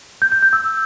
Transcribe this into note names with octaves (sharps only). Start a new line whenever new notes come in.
G6
G6
G6
E6